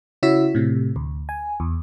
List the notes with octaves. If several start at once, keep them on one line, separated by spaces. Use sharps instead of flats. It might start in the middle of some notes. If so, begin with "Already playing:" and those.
C#3 E4 F#4 C#5 E6 B6
A2 C3
D2
G#5
E2